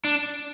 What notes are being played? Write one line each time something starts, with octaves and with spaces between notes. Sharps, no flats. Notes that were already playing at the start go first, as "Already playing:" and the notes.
D4